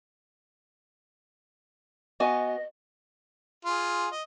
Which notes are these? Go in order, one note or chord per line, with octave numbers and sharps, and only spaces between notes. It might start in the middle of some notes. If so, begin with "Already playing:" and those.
B3 F#4 D#5 G#5
F4 G#4
D#5